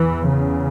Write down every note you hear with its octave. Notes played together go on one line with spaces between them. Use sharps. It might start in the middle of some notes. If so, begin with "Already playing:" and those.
Already playing: E2 E3
C#3